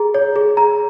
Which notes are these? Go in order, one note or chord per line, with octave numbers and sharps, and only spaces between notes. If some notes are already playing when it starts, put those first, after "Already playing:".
Already playing: G#4 A#5
C#5
G#4
A#5